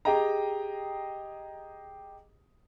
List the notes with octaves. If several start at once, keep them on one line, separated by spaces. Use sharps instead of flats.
G4 G#4 D#5 G5 A#5